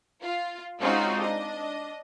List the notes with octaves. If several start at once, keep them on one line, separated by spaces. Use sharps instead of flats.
F4
G#3 C4 C#4 D#4 F4 F#4
D4 D#5